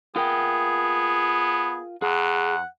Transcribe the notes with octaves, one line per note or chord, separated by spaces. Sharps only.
B3 F4 G#4 A#4 G5
F2 G#4 F#5